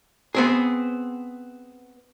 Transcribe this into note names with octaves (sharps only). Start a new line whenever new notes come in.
B3 C4 G#4